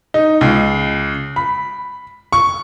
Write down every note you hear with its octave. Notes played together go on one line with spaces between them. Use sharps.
D#4
C#2
B5
C#6